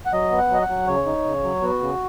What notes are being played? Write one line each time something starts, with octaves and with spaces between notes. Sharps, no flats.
F#5
F#3 D#5
B3
F#5
F#3 D#5
F#5
F#3
C#3 C#5
D#4
C#3
F#3
B3 F#4
C#3